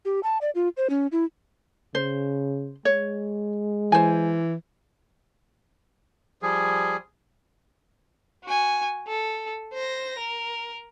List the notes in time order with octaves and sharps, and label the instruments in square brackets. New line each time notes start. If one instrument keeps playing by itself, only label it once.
[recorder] G4
A5
D5
F4
C5
C#4
E4
[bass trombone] C#3 [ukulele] C5
[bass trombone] G#3 [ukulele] C#5
[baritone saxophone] E3 [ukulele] C5 G#5
[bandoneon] F3 G3 G#4
[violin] F#4 G#5
A4
C5 A#6
A#4